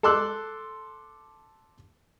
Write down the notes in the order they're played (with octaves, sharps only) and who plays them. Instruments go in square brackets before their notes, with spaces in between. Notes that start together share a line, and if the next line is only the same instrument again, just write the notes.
[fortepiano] A4 A5 C6 D6 E6 F#6